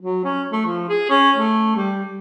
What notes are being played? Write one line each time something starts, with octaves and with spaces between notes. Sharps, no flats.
F#3
C#4
A3
F3
G#4
C#4
A3
G3